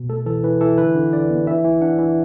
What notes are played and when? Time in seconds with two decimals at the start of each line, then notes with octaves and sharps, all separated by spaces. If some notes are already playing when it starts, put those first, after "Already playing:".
Already playing: B2
0.09 A3 A4
0.26 E3 A4
0.44 E3 B4
0.61 E3 A4
0.78 D3 B4
0.95 D3
1.13 D3 D5
1.30 B3
1.47 E3 E5
1.65 E3
1.81 D4 F#5
1.99 E3